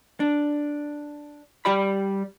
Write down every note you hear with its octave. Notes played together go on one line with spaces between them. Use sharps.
D4
G3 G4 D5 B5